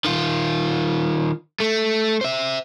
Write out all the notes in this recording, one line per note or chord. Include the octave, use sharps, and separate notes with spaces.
D#3 F4
A3
C5 E5